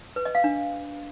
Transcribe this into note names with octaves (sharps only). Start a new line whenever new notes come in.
B4
D#5
F5
D4